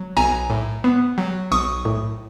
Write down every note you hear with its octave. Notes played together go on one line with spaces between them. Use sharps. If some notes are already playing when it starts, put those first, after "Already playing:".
Already playing: F#3
B1 G#5 A#5
A2
B3
F#3
B1 C#6 D#6
A2